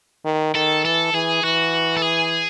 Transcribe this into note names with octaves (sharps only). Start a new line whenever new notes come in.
D#3
D#3 A4
E3 A4
E3 G#4
E3 F#4
A4
G#4